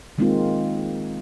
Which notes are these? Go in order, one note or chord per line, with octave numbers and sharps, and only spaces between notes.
D#3 G#3 A#3 C4 D#4 F4